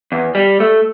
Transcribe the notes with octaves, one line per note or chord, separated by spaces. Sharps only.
E2
G3
A3